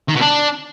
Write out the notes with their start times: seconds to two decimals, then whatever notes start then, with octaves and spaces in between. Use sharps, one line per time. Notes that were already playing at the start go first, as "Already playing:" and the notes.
0.09 D#3
0.15 B2
0.21 D4